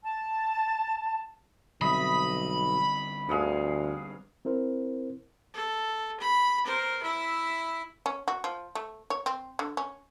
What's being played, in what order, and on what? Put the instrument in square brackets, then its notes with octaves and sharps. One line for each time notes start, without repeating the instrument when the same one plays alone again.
[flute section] A5
[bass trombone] B1 [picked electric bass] D3 G3 C4 [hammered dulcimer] D#5 E5 [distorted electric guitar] B5
[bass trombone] D2 [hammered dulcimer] G2 G#4 F5
[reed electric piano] C4 E4 A#4 C5
[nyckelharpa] A4
B5
A#4 C5
E4 E5
[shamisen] C#4
F#4
F3
A3
C#5
C4
D3
C#4